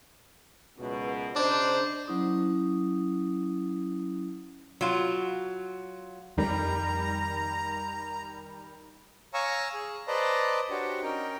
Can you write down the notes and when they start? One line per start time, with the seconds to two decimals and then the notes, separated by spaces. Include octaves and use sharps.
0.78 C#2 F#2 B2
1.36 C#3 D4 D#4 C5
2.08 F#3 C#4 E4 D#6
4.81 F#3 F4
6.38 F2 D#3 G3 A#5
9.34 C#5 F5 G#5 A#5 C#6 E6
9.74 G#4
10.08 B4 C5 D5 D#5 A5 A#5
10.70 D4 F#4 G4 C5 C#5
11.03 C#4 D#4 A#4 G5